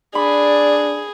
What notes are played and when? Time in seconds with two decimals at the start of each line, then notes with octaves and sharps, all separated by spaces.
0.15 D4 G#4 D5 B5